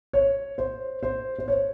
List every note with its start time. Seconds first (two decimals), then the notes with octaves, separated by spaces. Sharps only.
0.13 C#5
0.58 C5
1.03 C5
1.39 C5
1.48 C#5